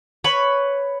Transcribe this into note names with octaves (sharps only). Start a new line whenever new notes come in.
B4 C#5 B5